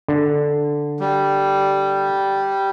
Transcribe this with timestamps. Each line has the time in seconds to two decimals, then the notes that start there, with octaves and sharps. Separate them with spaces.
0.08 D3
1.00 G3